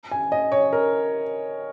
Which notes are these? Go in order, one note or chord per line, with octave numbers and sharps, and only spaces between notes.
G#5
D#5
C#5
A#4